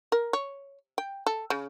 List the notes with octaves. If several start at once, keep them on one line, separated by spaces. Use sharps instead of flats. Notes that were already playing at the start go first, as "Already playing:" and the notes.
A#4
C#5
G5
A4
C#3